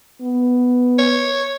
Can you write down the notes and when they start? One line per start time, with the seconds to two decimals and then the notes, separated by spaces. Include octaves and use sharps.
0.22 B3
0.99 C#5